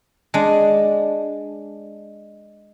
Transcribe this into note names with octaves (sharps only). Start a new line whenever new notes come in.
G#3 D4